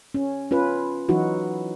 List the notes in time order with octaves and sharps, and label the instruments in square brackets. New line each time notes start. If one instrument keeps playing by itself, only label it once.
[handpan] C#4
C#4 F4 B4
E3 F#3 D#4 E4 F#4